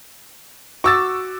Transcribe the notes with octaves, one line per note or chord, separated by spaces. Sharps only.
F#4 C#6 D6 E6 A6